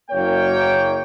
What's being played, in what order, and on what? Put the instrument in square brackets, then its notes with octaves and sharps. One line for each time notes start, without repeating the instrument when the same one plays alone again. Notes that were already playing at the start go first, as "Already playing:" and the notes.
[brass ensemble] F#1 A#3 C#5 G5